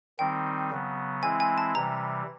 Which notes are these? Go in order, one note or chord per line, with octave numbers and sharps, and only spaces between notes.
D#3 G3 C4 D#4 G5
C#3 F#3 B3
E3 G#3 C4 E4 G#5
G#5
A5
C3 E3 G3 A#5